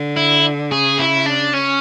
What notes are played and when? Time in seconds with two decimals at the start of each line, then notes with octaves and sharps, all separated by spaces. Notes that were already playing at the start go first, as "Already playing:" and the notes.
Already playing: D3
0.17 E4
0.71 C#3 G#4
0.99 E4
1.26 D4
1.53 C#4